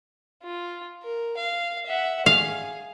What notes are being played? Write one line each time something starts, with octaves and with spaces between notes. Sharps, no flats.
F4
A#4
F5
E5 F#5
G#4 F5